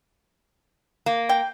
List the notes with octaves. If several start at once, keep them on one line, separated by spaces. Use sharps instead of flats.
A#3
G5